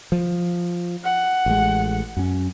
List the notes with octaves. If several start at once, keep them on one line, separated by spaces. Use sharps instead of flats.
F3
F#5
A1 G#3
F#2 C#4